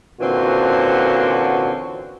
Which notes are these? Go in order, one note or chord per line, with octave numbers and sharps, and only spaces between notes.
A#2 D3 E3 C4 C#4 F#4